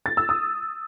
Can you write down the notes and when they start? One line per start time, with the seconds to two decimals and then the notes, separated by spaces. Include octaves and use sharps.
0.06 A6
0.17 E6
0.29 D#6